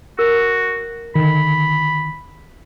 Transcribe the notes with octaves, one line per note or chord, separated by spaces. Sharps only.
F#4 A#4
D3 D#3 B5